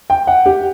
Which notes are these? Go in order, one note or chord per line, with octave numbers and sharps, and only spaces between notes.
G5
F#5
G4